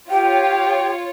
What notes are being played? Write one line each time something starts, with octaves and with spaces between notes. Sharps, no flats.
F4 G4 C#5 G5